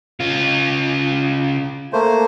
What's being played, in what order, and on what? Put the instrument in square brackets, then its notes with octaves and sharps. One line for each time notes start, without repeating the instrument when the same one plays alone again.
[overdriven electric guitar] C#3 F4
[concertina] A3 A#3 C5